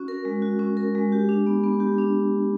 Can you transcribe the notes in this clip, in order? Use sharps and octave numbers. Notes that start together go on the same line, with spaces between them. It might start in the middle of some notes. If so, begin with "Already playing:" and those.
Already playing: C#4 F#4
A#4
G#3
F#4
C#4
A#4
G#3
G4
D4
B3
B3
G4
D4